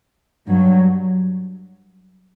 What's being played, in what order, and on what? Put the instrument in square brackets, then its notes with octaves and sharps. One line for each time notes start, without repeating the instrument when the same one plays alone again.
[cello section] G2 F#3